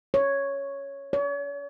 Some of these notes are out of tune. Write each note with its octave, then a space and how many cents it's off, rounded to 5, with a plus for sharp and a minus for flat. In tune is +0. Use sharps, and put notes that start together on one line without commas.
C#5 +0
C#5 +40